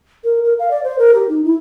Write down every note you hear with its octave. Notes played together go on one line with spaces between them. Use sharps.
A#4
A#4
F5
D5
C5
A#4
G4
D#4
E4